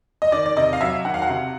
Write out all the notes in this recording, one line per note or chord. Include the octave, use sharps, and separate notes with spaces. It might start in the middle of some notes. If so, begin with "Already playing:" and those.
D#5
D#3 D5
D5
C3 D#5
F5
F#3 E5
D#3 F#5
F5
F#5
C3